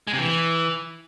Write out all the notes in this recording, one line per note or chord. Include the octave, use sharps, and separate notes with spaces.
G#3
C3
E3